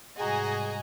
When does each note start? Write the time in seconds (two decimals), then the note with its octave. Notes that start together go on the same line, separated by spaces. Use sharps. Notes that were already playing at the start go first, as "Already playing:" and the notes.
0.17 G#2 C3 G3 F#4 G#4 D#5 G#5 A#5